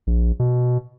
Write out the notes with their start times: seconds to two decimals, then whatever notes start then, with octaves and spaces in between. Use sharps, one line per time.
0.07 A#1
0.40 B2